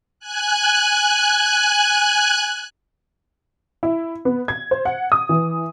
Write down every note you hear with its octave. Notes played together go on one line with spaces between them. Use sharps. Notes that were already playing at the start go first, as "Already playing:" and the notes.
G#5 F#6
E4
B3
G#6
C5
F#5
D#6
E3